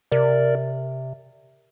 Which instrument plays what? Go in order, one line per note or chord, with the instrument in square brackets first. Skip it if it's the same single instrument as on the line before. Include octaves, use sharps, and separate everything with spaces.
[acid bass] C3 [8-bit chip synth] A#4 D5